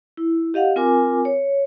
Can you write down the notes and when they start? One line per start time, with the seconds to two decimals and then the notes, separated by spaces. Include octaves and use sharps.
0.17 E4
0.54 G4 D#5 F5 F#5
0.76 C4 F4 A#4 G#5 D6
1.25 C#5